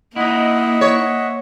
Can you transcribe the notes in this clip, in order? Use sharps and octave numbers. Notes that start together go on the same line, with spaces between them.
A#3 D#4 E4 D#5 E5 F#5
C#5